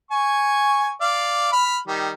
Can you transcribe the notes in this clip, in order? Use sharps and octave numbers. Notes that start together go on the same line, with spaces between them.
G#5 C#6
D5 F5
B5 F6
D#3 G3